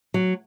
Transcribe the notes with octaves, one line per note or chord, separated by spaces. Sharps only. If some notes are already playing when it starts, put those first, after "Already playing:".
F#3